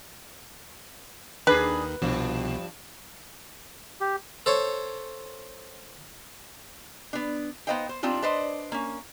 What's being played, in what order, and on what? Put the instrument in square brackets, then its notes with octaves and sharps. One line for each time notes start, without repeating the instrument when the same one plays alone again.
[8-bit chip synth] D#2 D#3 [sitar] D4 G#4 [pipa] B4
[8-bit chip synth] C2 B2 [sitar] G2 F3
[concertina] G4
[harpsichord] A4 C5 C#5
[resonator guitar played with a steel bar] B3 D4
B3 D#4 C5 D#5 F5 G5
C5
G3 C4 D4 D#4 F4
D4 B4 C5 D5 D#5
A#3 C#4